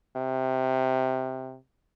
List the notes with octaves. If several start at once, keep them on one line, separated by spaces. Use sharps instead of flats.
C3